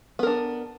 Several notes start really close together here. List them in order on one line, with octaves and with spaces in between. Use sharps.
B3 A#4 D4